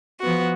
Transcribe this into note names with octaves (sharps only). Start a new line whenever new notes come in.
F3 B3 F#4